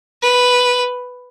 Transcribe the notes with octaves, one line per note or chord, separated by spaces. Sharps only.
B4